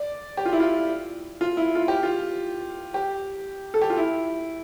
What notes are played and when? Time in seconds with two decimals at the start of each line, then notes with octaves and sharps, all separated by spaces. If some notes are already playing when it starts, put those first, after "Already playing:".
Already playing: D5
0.37 G4
0.45 F4
0.53 E4
0.60 F4
1.41 F4
1.57 E4
1.75 F4
1.88 G4
2.03 F4
2.94 G4
3.74 A4
3.82 G4
3.90 F4
3.97 E4